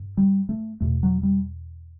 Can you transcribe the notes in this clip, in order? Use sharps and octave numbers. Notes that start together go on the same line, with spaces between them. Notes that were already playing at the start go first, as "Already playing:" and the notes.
Already playing: G2
G3
A3
E2 B2 A3
F#3
G3